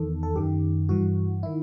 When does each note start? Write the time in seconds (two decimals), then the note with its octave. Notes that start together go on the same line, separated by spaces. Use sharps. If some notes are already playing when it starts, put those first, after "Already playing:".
Already playing: E2 D#3 A4
0.23 A4
0.35 F#2 D#3 G4
0.89 G2 E3 F#4
1.43 D#3 E4